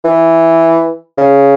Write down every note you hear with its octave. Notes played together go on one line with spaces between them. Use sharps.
E3
C#3